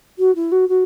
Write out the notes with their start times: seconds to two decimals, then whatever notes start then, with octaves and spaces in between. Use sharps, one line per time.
0.19 F#4
0.35 E4
0.52 F#4
0.69 F#4